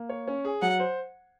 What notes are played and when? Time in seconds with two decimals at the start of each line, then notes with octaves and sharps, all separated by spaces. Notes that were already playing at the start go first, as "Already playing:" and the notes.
Already playing: A#3
0.09 C#5
0.27 C#4
0.45 G#4
0.62 F#3 F#5
0.80 C5